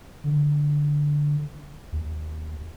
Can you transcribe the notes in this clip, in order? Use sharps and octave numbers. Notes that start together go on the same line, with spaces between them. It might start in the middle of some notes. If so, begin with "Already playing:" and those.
D3
D#2